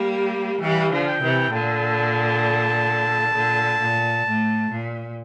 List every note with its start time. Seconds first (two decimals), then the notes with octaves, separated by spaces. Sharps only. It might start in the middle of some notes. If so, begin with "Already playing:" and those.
Already playing: G3 A#3
0.15 G4
0.61 E3 G3 F5
0.91 D3 F3
1.07 G5
1.21 C3 E3
1.52 A#2 D3 A5
3.34 A#2 D3
3.80 A#2
4.26 A2
4.70 A#2